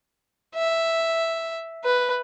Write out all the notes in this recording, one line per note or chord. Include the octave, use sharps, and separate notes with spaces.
E5
B4